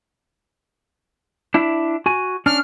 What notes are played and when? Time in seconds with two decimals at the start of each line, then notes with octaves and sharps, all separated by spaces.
1.54 D4 E4 E5
2.06 F#4 G#5
2.46 C#4 D4 F6